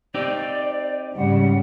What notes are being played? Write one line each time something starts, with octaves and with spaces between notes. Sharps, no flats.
C4 D#4 G4 D5
G#2 C#3 G3 F#5